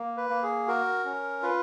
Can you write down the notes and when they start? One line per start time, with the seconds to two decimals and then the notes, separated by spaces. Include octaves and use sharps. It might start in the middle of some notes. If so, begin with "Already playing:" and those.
Already playing: A#3
0.17 B4
0.30 A#3
0.43 G#4
0.68 F#4 A#4
1.05 C#4
1.43 F4 B4